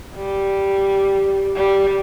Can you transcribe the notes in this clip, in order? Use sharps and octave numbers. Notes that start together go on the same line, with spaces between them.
G3
G3